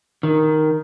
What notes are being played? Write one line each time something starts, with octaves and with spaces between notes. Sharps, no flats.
D#3